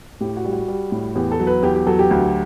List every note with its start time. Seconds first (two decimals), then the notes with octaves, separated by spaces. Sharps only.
0.21 A2 G4
0.37 F#4
0.45 G3
0.53 F#4
0.68 G3
0.92 A2
1.15 E2 G4
1.32 A4
1.40 F#3
1.47 B4
1.63 E2 G4
1.75 G4
1.87 F#3 A4
1.99 G4
2.11 D2